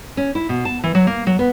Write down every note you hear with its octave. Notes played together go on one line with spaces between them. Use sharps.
C#4
E4
B2
A5
E3
F#3
A#3
F#3
B3